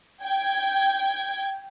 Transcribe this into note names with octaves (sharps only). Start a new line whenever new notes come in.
G5 G#6